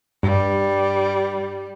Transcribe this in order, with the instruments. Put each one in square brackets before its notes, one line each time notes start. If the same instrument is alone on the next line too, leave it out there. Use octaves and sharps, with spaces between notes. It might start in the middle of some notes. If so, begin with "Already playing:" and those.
[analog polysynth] G2 [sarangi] G3